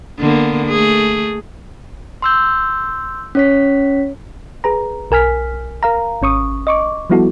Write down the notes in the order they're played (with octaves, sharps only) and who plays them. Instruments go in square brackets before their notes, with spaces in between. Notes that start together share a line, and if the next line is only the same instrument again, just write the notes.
[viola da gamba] D3 A#3 B3
A3 G#4
[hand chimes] C6 E6 G6
C#4 C#5 B6
[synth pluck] G#4 B4 A#5
B1 A#4 G#5 F6 B6
A#4 F5 A#5
G#1 C#4 C#6 D#6
D#5 C#6 D6
F3 G3 B3 E4 F#4 A4